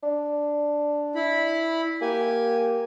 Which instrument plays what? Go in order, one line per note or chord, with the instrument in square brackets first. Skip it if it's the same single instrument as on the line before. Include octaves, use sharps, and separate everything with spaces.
[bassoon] D4
[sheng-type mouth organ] E4 B5
[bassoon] A#3 [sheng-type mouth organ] G4 G#5